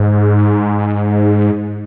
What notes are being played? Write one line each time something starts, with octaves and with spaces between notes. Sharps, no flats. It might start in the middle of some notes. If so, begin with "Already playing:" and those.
Already playing: G#2